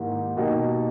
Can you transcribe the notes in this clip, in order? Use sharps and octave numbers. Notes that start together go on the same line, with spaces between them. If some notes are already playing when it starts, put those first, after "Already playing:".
Already playing: G#2 D#3 A#3 E4 G4
B2 A#3 D#4 G4